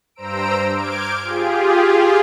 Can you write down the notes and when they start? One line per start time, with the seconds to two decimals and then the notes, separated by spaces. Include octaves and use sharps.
0.15 G2 C5 A#5 E6 D7
0.75 D6 F6 G6 G#6 D7
1.22 F4 G4 G#4